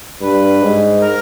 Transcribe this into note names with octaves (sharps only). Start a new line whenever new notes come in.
G2 B4
G#2
A#4